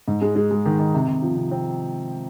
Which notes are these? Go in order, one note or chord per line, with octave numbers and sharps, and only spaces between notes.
G#2
G#3
G#3
G#3
D#3
D#3
C3
C3
F3
C3
C4